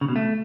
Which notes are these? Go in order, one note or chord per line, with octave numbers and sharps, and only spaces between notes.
C#3
B2
A3